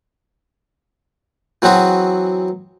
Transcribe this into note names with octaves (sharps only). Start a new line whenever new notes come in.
E3 F#3 C4 F#4 G#4